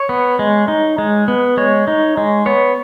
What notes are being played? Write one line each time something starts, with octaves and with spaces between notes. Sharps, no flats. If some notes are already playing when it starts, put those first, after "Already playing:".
Already playing: C#5
B3
G#3
D#4
G#3
B3
G#3 C#5
D#4
G#3
B3 C#5